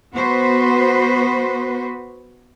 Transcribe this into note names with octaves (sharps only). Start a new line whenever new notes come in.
B3 F#4 B4 C5